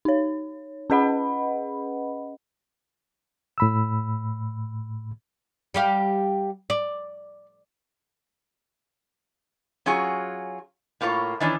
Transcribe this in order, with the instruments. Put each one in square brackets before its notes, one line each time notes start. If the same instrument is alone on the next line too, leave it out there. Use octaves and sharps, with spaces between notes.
[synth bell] D#4 C#5
C#4 G#4 B4 D#5 F#5 B5
[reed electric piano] A2 B5 E6
[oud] G3 G4 F5
D5
[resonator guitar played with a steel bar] F#3 C#4 F4 F#4 G#4
A2 A#3 F4 B4 C#5
D#3 E3 C#4 D4